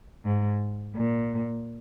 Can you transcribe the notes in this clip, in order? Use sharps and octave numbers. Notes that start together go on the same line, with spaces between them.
G#2
A#2